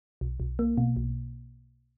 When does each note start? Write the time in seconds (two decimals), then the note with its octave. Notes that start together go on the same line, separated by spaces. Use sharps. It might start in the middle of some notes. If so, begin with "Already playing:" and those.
0.21 B1
0.40 B1
0.59 A#3
0.78 B2
0.96 B1